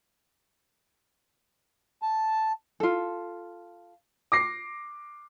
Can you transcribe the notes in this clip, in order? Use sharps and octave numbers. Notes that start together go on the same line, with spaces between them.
A5
F4 A4
D6 A#6 C7